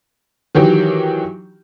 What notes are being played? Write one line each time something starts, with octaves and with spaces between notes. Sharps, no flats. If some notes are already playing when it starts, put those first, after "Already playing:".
D#3 E3 F#3 G4